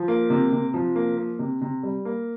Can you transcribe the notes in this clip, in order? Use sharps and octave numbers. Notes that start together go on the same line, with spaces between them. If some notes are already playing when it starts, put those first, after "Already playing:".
Already playing: F3
A#3
C3
C3
F3
A#3
A#3
C3
C3
G3
A#3